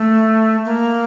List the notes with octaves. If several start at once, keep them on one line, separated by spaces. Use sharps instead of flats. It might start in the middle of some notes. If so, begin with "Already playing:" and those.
Already playing: A3
A#3